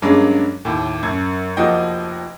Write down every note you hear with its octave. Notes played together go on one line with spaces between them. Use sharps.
G2 F#3 G#3 A#3 C#4 D4
D#2 A2
F#2 G#6
F1 F3 A#3 F#4 D#5 G5